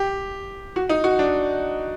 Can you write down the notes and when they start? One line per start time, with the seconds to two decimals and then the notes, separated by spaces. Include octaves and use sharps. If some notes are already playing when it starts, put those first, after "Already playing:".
Already playing: G4
0.76 F#4
0.89 D#4
1.04 F#4
1.19 D4